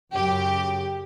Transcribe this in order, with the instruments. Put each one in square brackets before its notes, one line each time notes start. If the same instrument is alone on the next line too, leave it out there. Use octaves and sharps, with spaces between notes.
[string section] F#2 C#3 F#3 G4